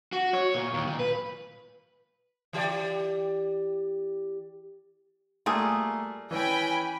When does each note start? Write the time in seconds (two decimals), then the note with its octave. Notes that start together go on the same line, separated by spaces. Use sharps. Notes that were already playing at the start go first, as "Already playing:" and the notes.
0.13 F#4
0.33 C#5
0.55 A#2
0.74 D#2
0.87 A#2
0.99 B4
2.53 E3 G4 D5
5.46 G3 A3 A#3 F4 G#4
6.31 E3 C#4 G5 G#5 B5